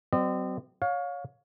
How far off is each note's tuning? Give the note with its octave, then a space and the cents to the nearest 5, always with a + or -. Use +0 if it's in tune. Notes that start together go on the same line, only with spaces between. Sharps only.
F#3 +25 C4 -30 D#5 -45
C#5 +15 F5 +30